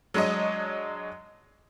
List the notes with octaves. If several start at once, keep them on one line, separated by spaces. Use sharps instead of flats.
F#3 G#3 D4 C#5 D#5